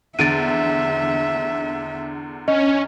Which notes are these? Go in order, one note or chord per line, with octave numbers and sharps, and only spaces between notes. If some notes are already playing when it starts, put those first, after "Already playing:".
E2 D3 E5 A6 D7 D#7
C#4 D#5